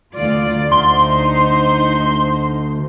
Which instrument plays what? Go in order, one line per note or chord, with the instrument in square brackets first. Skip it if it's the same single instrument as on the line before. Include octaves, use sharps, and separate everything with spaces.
[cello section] D2 F4 D5
[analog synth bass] D2 [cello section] D#4 C5 [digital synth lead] C6